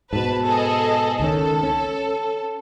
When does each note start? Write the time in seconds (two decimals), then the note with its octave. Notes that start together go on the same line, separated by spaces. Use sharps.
0.13 G#2 B2 B4 A5
0.46 G#4 A4 D#5
1.20 C#2 D#3 C#4 A4
1.63 C#4